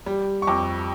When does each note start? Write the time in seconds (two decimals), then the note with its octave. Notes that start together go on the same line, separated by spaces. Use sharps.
0.06 G3
0.42 C#6
0.47 F2 D6